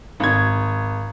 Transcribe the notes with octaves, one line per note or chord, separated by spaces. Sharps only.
G#1 G#6